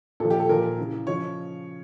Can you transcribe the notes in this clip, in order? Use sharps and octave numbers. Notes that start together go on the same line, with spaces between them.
A#2 F3 A4
G4
A4
A#2 F3 A#4
C#3 E3
C#3 F3 C#5